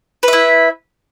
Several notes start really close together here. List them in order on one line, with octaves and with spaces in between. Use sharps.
B4 E5 E4